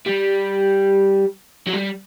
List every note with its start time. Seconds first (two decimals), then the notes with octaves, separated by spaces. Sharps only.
0.06 G3
1.67 F#3
1.73 G3